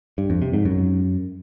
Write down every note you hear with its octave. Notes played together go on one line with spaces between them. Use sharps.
G2
F2
C3
G#2
F#2